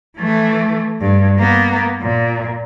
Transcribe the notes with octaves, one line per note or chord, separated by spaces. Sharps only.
E3 A3
G2
A#3 B3
A#2